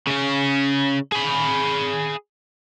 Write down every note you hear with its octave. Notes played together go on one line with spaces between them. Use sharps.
C#3 C#4
G#4 B5